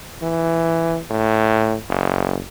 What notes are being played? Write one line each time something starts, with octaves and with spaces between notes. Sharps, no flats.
E3
A2
F#1